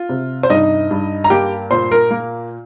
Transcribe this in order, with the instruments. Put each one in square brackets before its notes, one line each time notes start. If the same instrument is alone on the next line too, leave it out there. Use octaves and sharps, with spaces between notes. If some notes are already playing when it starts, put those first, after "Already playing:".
Already playing: [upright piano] F4
C3
C5
G2 D#4 D#5
G2
A#5
A#3 G4 G5
A#2 C5 C6
A#4
A#3